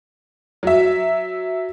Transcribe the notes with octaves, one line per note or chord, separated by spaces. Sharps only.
F#3 E5